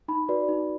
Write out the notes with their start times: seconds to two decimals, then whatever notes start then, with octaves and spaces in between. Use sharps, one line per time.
0.08 D#4 B5
0.29 F#4 B4 D5
0.49 D#4